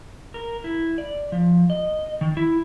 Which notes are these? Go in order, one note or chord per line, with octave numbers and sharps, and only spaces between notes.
A#4
E4
D5
F3
D#5
D#3
E4